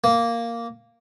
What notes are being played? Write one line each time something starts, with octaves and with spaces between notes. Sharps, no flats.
A#3